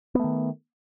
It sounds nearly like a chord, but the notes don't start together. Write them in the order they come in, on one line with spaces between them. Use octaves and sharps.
B3 A3 D#3